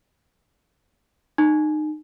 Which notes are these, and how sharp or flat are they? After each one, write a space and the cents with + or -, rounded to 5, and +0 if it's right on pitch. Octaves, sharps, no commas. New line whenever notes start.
D#4 -30